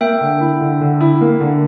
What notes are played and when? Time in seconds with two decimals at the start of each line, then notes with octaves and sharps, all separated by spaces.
0.01 A#3 E5 G5
0.21 D3
0.40 E4
0.61 D3
0.81 D3
1.01 E4
1.21 A#3
1.40 D3